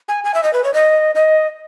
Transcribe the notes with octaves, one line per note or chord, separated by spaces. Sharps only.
G#5
G#5
E5
D#5
B4
C#5
D#5
D#5